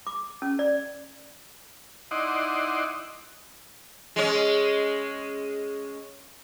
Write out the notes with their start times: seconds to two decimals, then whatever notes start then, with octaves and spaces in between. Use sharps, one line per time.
0.07 D6
0.42 C#4
0.59 D5
2.11 D#4 E4 D5 D#5 F#5 C6
4.16 G#3 C#4